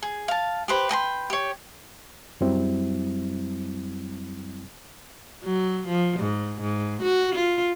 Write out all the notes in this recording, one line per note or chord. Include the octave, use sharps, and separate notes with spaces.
G#4
F5 A5
G4 B4 C5
B4 G5 A#5 C6
G4 C#5
F#2 F#3 G3 C4 E4
F#3
F3
G#2
G#2
F#4
F4